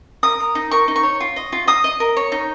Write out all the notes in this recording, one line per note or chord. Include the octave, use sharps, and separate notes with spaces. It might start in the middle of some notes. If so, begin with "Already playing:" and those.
A#4 D#6
A#4
D#4
A#4 C#6
D#4
C#6
C#5
F4
D#5
F4
D#5 D#6
D#5
A#4
C#5
D#4